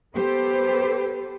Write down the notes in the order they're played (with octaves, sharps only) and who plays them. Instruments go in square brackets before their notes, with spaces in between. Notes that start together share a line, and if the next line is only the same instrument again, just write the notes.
[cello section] B3 G4 A4 B4 C5